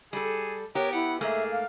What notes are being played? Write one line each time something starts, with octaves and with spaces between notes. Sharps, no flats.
G3 G#4 A4
B3 G4 A#4 C#5
E4 F#5
G#2 A3 A#3 G#4 E5
F5